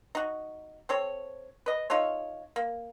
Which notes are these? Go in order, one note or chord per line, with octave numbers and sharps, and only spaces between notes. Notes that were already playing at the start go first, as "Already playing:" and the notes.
D#4 F#4
C4 A4 C#5
B4 D#5
D#4 F4 A4 C#5
A#3